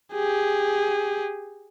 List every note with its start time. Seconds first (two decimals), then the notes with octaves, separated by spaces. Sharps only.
0.13 G4 G#4